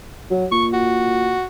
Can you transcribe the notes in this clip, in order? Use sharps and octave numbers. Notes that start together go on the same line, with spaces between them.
F#3
A#2 C#6
F#4